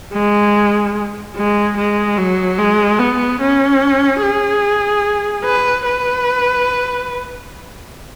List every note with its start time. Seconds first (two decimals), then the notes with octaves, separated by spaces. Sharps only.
0.13 G#3
1.35 G#3
1.77 G#3
2.18 F#3
2.59 G#3
2.99 B3
3.41 C#4
4.22 G#4
5.45 B4
5.86 B4